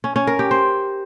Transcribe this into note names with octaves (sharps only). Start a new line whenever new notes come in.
C#4
C#4
A#4
G4
C5